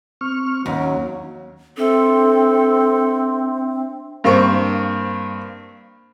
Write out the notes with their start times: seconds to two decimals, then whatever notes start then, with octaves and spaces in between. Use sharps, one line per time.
0.21 C4 C#6 F6
0.66 D#2 F#3 C#4
1.77 C4 D4 A4 E5
4.24 G2 A#3 C4 C#6